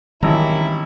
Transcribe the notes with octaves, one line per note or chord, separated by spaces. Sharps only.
G#1 D#3 E3 G3 A#3 C#4 E4 A#5